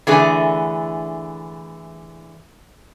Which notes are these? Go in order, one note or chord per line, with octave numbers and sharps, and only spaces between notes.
D3 E3 A3 G#4